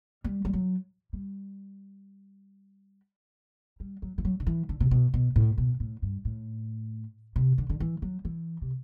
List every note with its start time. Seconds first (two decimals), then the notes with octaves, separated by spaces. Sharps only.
0.24 G3
0.45 G3
0.53 F#3
1.13 G3
3.80 G3
4.02 F#3
4.18 E3
4.25 F#3
4.40 D3
4.47 E3
4.69 D3
4.80 C3
4.91 B2
5.14 B2
5.36 A2
5.58 B2
5.80 A2
6.02 G2
6.25 A2
7.36 C3
7.58 D3
7.70 D3
7.80 E3
8.02 F#3
8.25 E3
8.62 C3